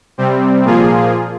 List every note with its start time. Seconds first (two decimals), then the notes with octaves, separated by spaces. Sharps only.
0.18 C3 G3 C4
0.64 A#2 F3 A#3 F4 G#4